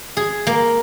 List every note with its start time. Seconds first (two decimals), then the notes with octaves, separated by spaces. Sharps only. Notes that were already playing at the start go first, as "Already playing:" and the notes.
0.17 G#4
0.47 A#3